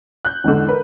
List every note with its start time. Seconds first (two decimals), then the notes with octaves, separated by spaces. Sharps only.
0.25 F#6 G6
0.44 E2 G#2 D3
0.69 A#4 B4